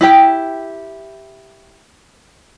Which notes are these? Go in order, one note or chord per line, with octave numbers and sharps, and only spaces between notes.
E4 G4 G5